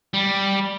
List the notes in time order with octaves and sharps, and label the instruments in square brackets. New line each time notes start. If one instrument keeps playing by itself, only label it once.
[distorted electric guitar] G3